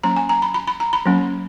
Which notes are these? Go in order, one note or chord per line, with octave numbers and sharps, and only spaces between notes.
F#3 A#3 C#4 A#5
G#5
A#5
B5
B5
B5
A#5
B5
F#3 A#3 C#4